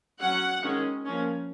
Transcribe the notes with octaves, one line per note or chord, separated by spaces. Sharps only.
F#3 C#4 F#5
D#3 G#3 C#4
F3 A#3 C#4